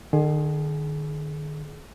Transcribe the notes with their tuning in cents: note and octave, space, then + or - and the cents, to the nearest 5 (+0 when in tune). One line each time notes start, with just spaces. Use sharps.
D#3 -45 G#4 +25